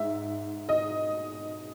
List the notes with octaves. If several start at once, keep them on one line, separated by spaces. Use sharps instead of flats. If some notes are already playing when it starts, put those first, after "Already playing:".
Already playing: G#2 E5
D#5